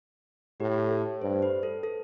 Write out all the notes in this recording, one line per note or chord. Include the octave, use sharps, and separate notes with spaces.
A2 G4
A4
G2 C5
B4
A4
A4